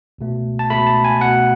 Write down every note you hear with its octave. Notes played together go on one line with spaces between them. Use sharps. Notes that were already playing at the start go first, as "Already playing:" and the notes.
C#2 B2 A3
A5
C#2 B2 A3 B5
A5
G#5
B2 A3 F#5